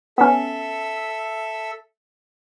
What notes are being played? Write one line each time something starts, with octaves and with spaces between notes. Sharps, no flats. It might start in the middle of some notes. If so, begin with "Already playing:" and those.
B3 C#4 A4 E5